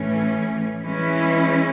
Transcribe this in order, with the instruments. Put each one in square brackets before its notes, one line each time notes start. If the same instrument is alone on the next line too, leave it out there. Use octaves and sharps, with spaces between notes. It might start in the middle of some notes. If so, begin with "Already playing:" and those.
Already playing: [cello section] A2 E3 A3 C#4
E3 G#3 C#4 E4